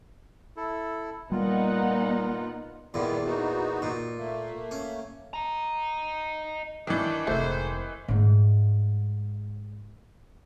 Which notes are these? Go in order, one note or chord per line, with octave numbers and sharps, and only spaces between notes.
E4 A4
A#2 G3 B3 D#4 F4 F#5
E2 A#2 D#3 G3 B3
B3 D#4 F#4
A#2
A3 A#3
C#4
D#5 A#5
D#3 E3 D4
F1 G#2 C3 A3 C5
G#2 A3